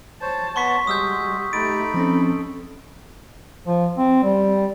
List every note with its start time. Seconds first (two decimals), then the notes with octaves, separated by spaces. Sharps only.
0.22 C5 C#5 A5
0.56 B3 C#5 F#5 C6 C#6 B6
0.87 G3 G#3 F#4 D#6 E6 G6
1.23 G3
1.53 A3 D#4 G4 B5 A6 D7
1.94 F3 C4 C#4 A4
3.68 F3
3.98 C4
4.23 G3